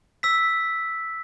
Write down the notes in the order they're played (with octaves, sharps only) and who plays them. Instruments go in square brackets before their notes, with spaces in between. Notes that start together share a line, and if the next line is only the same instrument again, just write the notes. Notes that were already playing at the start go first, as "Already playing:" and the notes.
[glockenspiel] E6 B6